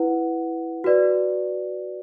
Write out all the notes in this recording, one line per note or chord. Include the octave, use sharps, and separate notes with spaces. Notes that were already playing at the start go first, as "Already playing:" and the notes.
Already playing: E4 B4 F#5
F#4 B4 D5